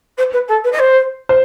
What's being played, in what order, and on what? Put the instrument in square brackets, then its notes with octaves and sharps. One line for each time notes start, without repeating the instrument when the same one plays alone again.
[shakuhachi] C5
B4
A4
B4
D#5
C5
[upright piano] C5